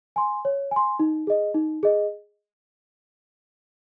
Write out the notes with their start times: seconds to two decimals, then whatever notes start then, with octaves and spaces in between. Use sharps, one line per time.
0.16 G#5 C6
0.45 C#5
0.71 G#5 C6
0.99 D#4
1.27 G#4 D#5
1.54 D#4
1.83 G#4 D#5